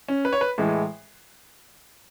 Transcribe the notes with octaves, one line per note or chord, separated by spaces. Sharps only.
C#4
B4
C#5
B4
A2 E3 G#3